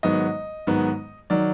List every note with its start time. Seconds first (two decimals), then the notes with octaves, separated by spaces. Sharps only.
0.03 G#2 D#3 F#3 B3 D#5
0.67 G#2 D#3 F#3 B3
1.30 D#3 F#3 D5